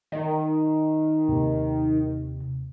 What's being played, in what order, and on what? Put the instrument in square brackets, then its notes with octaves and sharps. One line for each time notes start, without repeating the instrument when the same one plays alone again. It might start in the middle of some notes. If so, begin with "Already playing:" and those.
[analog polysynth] D#3
[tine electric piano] D#2 C3